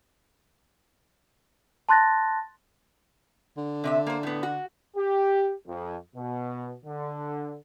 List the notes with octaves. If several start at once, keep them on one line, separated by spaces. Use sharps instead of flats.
A5 C6 F#6 A6 A#6
D3
C3 D5 E5
A#3 C5
A2 B3
F#4
G4
F2
B2
D3